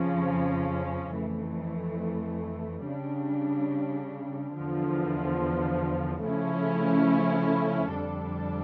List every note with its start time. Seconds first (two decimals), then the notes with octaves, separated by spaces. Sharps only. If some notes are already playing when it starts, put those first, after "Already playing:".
Already playing: F2 C#3 F3 C#4
1.17 F2 E3 A3
2.87 C#3 G3 D4
4.56 E2 D3 F3
6.24 C#3 F3 A3 C#4 E4
7.93 F2 D3 G3 D4 A4